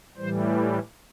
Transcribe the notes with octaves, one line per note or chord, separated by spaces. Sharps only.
A2 E3 G3 C5
E4